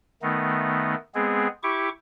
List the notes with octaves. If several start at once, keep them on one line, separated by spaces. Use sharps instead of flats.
D#3 A3 B3 D#4
G#3 B3 C4 G#4
E4 G4 C#6 D6